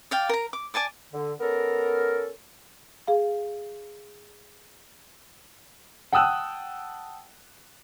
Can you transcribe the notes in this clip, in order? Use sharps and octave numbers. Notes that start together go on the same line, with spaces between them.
D5 F5 G5
A#4 A#5
D6
D5 G#5 A5 D6
D3
B3 C#4 A4 A#4
G#4 F5
F#5 G5 A5 D#6 E6 F#6